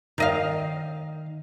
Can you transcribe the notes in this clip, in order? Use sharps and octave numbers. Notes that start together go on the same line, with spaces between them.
D#3 D#5 F5